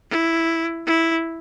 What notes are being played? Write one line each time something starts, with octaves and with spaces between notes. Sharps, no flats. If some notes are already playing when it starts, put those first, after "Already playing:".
E4
E4